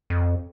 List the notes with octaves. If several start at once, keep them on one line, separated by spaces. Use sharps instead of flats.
F2